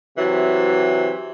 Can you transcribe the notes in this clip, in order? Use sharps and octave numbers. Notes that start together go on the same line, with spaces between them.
C3 E3 F#3